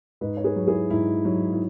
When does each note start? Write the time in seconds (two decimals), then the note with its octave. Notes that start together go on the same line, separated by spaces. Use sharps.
0.21 G#2 B4 D#5
0.37 C#5
0.44 G#4 B4
0.56 F#3
0.67 E4 G#4
0.90 G#2 E4
1.25 F#3
1.53 E4